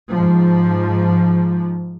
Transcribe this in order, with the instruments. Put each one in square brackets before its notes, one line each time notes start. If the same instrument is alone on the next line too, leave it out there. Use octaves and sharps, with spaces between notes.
[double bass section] G#2 F3